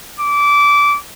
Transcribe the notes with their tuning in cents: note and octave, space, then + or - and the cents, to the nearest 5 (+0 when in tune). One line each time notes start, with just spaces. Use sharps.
D6 -20